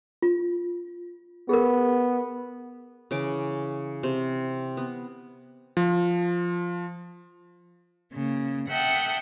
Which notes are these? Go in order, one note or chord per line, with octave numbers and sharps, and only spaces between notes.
F4
B3 G#4 A#4
C#3 E3 D6
C3
B3
F3
C#3 A#3
E5 F#5 G5 A5 D#6